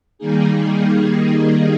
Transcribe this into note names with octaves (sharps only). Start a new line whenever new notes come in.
D#3 G3 A#3 D#4 G#4